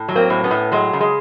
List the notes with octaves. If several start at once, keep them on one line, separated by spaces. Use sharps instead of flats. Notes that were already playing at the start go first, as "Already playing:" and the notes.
Already playing: A2
F#3
A#3 C4
A2
B3 C#4
A2
F#3 G#3
C#3
G#3